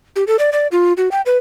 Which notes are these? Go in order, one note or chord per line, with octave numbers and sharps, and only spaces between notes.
G4
A4
D5
D5
F4
F#4
G5
B4